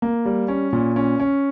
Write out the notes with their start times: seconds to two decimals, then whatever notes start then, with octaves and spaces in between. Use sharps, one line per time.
0.02 A#3
0.25 G3
0.48 C#4
0.73 A#2
0.96 C#4
1.20 C#4